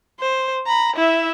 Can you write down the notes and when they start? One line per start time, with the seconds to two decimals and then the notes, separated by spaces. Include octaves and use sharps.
0.20 C5
0.67 A#5 B5
0.96 E4 E5